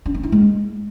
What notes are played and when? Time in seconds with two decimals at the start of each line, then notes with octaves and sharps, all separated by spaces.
0.06 D4
0.14 C4
0.23 E4
0.32 G#3